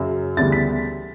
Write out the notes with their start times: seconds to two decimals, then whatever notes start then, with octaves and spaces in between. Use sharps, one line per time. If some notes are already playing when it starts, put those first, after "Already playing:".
Already playing: F#2 C#3 F#3
0.37 D2 C#3 E3 G3 B3 A6
0.52 B6